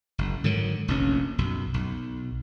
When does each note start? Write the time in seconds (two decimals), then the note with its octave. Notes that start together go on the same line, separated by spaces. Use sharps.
0.18 F#1
0.44 G#2 D3 D#3 F#3
0.88 F1 A#1 C#4
1.38 B1 F#2
1.74 B1